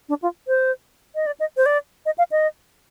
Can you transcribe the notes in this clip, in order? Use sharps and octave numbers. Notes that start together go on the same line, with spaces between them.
D4
F4
C5
D#5
D5
D#5
C5
D5
D#5
F5
D#5